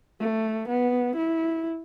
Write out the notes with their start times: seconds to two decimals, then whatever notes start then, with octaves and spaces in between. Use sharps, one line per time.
0.20 A3
0.68 B3
1.16 E4